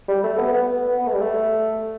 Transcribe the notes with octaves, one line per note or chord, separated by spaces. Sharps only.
G3
A3
B3
B3
B3
A3
G3
A3